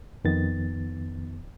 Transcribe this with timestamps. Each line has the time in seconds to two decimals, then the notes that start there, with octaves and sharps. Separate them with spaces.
0.25 F2 D#3 B3 A6